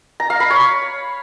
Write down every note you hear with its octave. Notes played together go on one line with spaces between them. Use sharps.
A#5
F5
B5
C#5